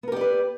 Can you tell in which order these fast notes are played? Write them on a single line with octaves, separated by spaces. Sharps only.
B3 A#4 G4 D5 B4